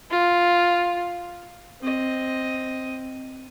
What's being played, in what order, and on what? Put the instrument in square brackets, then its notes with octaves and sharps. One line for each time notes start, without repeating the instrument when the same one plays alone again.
[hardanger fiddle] F4
[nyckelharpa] C4 D#5